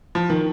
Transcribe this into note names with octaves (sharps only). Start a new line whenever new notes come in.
F3
D#3